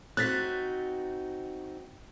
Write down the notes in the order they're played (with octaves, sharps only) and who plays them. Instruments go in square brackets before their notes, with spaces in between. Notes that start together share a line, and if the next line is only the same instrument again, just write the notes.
[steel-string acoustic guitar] C4 D#4 F#4 [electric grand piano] F#6 A6 B6